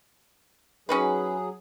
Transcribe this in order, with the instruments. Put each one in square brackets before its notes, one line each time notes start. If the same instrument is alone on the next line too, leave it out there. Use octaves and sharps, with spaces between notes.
[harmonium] F#3 G#4 [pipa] C#4 D#4 B4